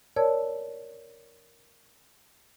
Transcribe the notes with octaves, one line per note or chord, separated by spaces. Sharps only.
A#4 C#5 D5 A5 E6 G#6